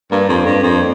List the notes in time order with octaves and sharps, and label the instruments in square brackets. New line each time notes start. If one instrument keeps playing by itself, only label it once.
[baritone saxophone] G2 [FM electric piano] A#3
[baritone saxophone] F2
G2
F2